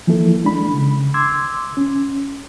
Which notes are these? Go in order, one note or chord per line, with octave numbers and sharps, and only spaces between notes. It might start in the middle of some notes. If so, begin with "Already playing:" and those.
E3 F3 A#3 E4 A4
G#3 D4 B5
C#3
C6 D6 E6 G#6
C#4